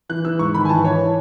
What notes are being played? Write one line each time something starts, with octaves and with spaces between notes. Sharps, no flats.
E3 F#6
E3 E6
G#2 C#6
D#3 B5
G#5
E3 A5
E3 C#5